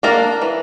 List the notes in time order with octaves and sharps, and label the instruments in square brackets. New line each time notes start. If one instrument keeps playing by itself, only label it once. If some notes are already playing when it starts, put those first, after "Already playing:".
[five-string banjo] A#3 D4 A#4
E3